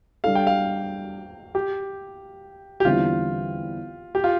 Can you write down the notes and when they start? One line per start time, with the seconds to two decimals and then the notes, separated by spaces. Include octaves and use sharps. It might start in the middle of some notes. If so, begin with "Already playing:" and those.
0.24 G3 D4 A4 F5
0.35 G5
0.47 F5
1.55 G4
2.80 G4
2.85 E2 D3 G3 C4 E4 F4
4.15 G4
4.24 F4